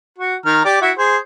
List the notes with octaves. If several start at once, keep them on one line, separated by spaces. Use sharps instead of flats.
F#4
D#3 A#5 F6
G4 D5
E4 F#4 E5
G#4 C5